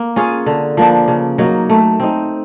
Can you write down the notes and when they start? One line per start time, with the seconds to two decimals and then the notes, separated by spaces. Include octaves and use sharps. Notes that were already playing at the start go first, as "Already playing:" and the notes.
Already playing: A#3
0.16 C#4 F4 G#4
0.46 D3
0.77 F3 A#3 D4
1.08 C#3
1.38 F#3 A#3 D#4
1.70 A3
2.00 C4 D#4